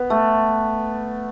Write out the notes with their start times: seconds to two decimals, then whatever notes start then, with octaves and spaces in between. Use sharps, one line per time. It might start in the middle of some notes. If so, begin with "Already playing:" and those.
Already playing: B3
0.10 A3